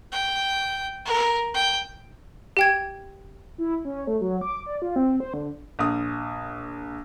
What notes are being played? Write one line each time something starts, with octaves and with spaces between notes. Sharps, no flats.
G5
A#4
G5
G4 G5 G#6
E4
C#4
A3
F#3
D6
D5
F4
C4
C5
D3
A#1 D#6